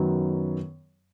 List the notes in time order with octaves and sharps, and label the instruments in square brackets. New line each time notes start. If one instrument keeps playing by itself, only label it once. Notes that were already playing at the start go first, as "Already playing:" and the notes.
Already playing: [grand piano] F#2 D#3 F#3 B3